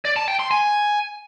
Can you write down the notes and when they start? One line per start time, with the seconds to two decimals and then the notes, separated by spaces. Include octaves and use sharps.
0.05 D5
0.16 A5
0.28 G5
0.39 C6
0.51 G#5